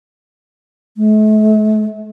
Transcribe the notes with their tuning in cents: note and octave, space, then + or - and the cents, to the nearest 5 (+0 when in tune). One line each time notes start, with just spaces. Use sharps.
A3 -40